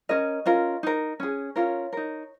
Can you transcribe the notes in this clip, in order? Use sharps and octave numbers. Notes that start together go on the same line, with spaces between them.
C#4 A#4 D#5
C#4 F4 A#4
D#4 A#4
C#4 G#4
C#4 F4 A#4 C#5
D#4 A#4